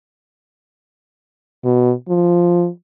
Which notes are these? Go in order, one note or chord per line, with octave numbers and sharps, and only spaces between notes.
B2
F3